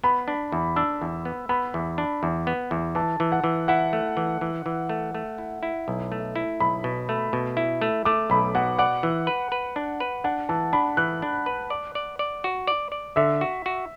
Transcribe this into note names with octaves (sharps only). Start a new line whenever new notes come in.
B3 B5
D4
E2
D4 E6
E2
B3
B3 B5
E2
D4
E2
B3
E2
E3 A5
E3
F#5
E3
E4 F#5
A3
E3
E3
E3
A3
A3
E4
E4
B1
A3
E4
B1 B5
B2
A3
B2
E4
A3
A3 D6
B1 B5
B2 F#5
D5 F#5
E3
B4
B4
D4
B4
D4 F#5
E3 A5
D4 B5
E3 F#6
D4
B4
D5
D5
D5
F#4
D5
D5
D3 E5
F#4
F#4